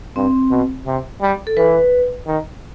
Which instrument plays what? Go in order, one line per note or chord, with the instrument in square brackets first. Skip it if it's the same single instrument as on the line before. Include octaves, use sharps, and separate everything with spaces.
[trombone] G2 [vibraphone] C4
[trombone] B2
C3
G3
[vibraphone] A4
[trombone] E3 [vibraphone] B4
[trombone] D#3